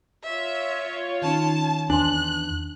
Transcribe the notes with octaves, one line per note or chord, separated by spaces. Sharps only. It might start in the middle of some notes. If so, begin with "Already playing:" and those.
F4 C#5 E5
D#3 C#4 D#4 A5
E2 D4 G#5 C6 F#6